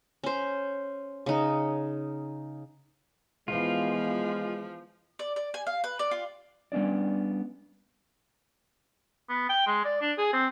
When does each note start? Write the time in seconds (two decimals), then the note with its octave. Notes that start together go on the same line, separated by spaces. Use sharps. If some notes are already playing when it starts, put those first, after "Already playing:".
0.24 C#4 C5
1.26 C#3 D#4
3.48 E3 F3 G#3 B3 F4
5.19 D5
5.36 D5
5.54 G#5
5.67 F5
5.84 B4
5.99 D5
6.11 F4
6.72 G3 B3 C#4 D4 D5
9.29 B3
9.49 G5
9.67 G#3
9.85 D5
10.01 D4
10.18 G#4
10.33 C4